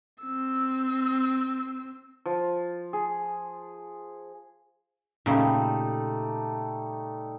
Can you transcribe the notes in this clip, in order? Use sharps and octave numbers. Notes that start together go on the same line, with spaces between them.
C4 E6
F3
G#4
A#2 C#3 G3 A3 D#4